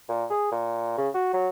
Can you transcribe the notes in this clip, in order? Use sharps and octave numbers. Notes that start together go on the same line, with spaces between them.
A#2
G#4
A#2
C#3
F#4
F#3